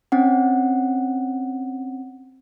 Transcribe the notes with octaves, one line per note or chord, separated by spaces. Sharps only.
C4 C#4 F#5